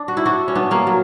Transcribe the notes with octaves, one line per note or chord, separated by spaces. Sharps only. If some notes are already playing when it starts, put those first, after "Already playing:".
Already playing: D4
F#4
E4
D4 F#4
C#4
B3 D4
A#3 C#4
F#3